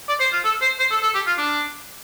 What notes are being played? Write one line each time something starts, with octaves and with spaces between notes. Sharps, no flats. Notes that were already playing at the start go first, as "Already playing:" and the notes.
D5
C5
F4
A4
C5
C5
A4
A4
G4
F4
D4